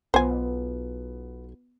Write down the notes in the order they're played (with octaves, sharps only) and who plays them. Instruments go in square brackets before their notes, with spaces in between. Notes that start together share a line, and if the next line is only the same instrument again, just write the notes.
[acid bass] B1 [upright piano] B3 F4 [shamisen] C5 G#5